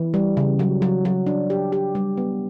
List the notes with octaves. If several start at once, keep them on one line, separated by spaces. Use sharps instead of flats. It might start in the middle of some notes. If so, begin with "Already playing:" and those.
Already playing: E3
G3
C#3
F#3
F#3
F#3
D4
G4
G4
G3
B3